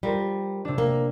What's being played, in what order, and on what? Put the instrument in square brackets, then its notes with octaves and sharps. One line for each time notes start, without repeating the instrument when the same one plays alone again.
[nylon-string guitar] G3 [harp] F4 A#4 C5
[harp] C3 D4
[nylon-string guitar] A#3